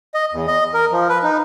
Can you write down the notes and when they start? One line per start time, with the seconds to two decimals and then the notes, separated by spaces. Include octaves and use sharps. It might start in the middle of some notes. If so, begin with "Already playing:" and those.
0.14 D#5
0.33 E2
0.47 D#5
0.74 A#4
0.92 F3
1.09 B4
1.23 D#4